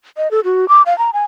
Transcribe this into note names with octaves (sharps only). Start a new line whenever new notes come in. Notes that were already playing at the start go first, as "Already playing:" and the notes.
D#5
A4
F#4
D6
F5
A#5
G#5